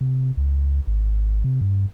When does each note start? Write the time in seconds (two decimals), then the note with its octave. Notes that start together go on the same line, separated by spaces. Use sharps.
0.01 C3
0.37 C#2
0.87 G#1
1.44 C3
1.61 G2